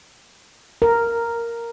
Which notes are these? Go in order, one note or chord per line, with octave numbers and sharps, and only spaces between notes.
A#4